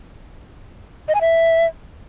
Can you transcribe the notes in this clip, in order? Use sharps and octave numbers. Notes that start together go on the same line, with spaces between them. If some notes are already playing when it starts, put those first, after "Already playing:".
D#5
G#5
E5